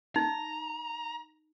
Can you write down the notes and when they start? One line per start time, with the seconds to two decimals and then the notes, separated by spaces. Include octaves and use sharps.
0.16 D#4 A#5